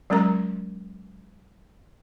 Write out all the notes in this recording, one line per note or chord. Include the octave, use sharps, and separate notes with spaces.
F#3 G#3 C#4 A#4 A#5